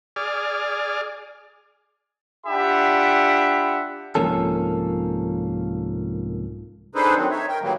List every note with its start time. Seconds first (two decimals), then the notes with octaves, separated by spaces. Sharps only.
0.16 G#4 D5 F6
2.47 D4 F4 G4 E5 F#5 B5
4.15 C2 G#2 F3 A#3 C#4 A4
6.95 D4 D#4 G#4 A4 B4 C5
7.16 D#3 F#3 C4
7.31 D#4 C#5 E5
7.48 A#4 G5
7.62 A2 D#3 E3 F#3 G3 A#3